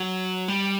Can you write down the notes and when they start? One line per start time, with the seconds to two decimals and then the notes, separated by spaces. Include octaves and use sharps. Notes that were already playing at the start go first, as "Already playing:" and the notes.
Already playing: F#3
0.48 G3